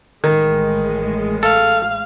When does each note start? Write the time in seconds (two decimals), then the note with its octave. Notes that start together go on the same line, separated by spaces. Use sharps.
0.24 A1 A2 D#3 G#3
1.43 A4 F5